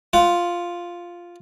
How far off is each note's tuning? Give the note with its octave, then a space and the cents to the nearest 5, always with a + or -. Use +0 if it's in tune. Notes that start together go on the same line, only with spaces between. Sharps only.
F4 +0 F#5 +25